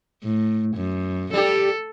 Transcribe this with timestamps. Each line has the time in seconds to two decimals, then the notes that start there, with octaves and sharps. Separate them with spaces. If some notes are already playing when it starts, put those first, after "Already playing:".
0.23 A2
0.76 F#2
1.33 G3 G4 A4